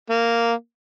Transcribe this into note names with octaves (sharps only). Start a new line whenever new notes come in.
A#3